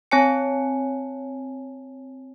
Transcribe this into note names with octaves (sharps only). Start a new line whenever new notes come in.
C4 C#5 G#5 A5 C#7